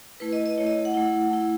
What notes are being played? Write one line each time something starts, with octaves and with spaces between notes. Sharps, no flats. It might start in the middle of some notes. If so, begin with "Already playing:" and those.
A3 E4 B4
D#5
D#5
A3 E4 C#5
D#5
F#5
A3 E4
A3 E4